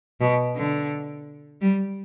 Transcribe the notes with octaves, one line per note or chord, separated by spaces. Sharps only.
B2
D3
G3